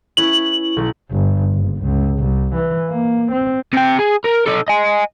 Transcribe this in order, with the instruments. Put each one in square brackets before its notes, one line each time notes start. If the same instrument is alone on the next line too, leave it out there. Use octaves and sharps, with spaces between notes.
[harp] C#4 E4 B4 [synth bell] F#7
[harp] B1
[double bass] G1
F#1
C#2
C2
E3
A#3
C4
[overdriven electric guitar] C3 G5
G#4
A#4
D#4 A4
D#5 G#5